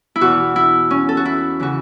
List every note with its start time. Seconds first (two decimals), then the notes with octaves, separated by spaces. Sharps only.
0.16 E4
0.21 E2 B2 F#4
0.56 E4
0.91 C#4
1.09 A4
1.17 F#4
1.25 E4
1.60 C#3 E3 F#4